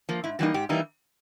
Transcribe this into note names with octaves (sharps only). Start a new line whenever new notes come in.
F3 A#3
G#2 E4
E3 G3 A#3 D#4 F#4
G#2 G4
E3 G3 A#3 D#4